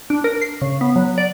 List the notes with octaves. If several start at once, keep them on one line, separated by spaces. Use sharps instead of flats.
D4
A#4
C7
C#3
B3
F#3
D5